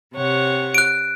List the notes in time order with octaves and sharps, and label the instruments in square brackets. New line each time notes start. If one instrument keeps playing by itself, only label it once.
[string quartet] C3 C#5 F#5
[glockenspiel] F#6 D7